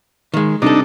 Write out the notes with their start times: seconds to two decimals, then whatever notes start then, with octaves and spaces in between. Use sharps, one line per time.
0.34 D#3 G#3
0.62 C3 G3 D4 D#4 A4